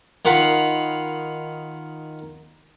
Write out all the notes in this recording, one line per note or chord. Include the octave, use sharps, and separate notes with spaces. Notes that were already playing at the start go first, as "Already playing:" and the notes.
D#3 F4 F#5 B5